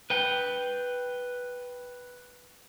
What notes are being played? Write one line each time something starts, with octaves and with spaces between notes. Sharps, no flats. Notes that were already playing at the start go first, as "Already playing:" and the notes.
B4 G5